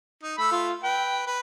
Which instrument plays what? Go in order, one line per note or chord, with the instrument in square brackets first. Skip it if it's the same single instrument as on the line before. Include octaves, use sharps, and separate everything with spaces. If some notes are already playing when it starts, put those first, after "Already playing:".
[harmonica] D#4
[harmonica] A3 E6 [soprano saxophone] B5
[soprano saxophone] F4
[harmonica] B4 [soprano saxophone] G5
[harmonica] B4